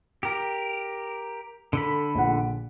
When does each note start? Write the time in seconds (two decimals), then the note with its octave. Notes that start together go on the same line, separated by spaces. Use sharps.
0.23 G4 A#4
1.73 D3 A4 B5
2.15 A#1 F#5